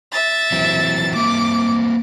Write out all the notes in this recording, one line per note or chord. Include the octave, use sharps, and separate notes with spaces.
E5 A6
E3 F#3 C4
A#3 C4 E5 D6